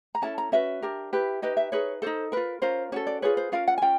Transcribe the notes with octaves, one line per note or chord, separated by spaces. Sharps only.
A#5
C#4 E4 A4 A5
A#5
C#4 F#4 B4 E5
D4 G4 A#4
E4 G4 B4
D#4 G4 B4 D#5
E5
D#4 G#4 B4 C#5
D#4 F#4 A4 C5
F4 A#4 B4
C#4 F4 A#4 C5
C#4 F#4 A4 C#5
D5
F4 G#4 B4 C#5
C5
C#4 F4 A#4 F5
F#5
G#5
C#4 F4 G5